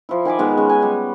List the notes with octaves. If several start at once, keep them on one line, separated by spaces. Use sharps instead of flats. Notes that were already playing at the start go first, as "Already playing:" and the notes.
F3 E4
D#3 G#5 B5 D6
D#3 G#3 B3
G#3 C#4
G#5
G3